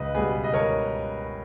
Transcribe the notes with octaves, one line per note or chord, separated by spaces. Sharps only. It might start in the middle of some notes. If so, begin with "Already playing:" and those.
Already playing: C#2 B4 D#5
B2 G3 G#4 B4
D#5
C#2 A#4 C#5